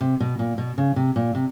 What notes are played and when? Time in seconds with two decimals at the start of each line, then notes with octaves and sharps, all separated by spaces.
0.01 C3
0.20 B2
0.39 A#2
0.58 B2
0.78 C#3
0.96 C3
1.16 A#2
1.35 C3